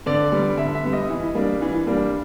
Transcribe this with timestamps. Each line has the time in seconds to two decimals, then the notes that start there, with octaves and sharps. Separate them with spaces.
0.06 D3 D5
0.32 G3 B3
0.57 D3 E5
0.75 E5
0.84 G3 B3
0.93 D#5
1.10 E3
1.35 G3 A#3 D4
1.61 E3
1.87 G3 A#3 D4